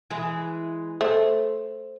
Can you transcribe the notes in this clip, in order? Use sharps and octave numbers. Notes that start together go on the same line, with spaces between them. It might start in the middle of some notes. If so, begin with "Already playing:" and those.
E3 G#3 G#4
A3 C5